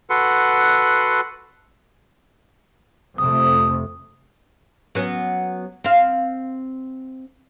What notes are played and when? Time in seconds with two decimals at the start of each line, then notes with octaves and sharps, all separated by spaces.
0.10 F#4 A4 B4 F#5 C6
3.18 F2 C3 A3 D#6
4.95 F#3 B3 C#4
5.84 C4 F5